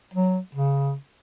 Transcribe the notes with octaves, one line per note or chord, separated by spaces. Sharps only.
F#3
C#3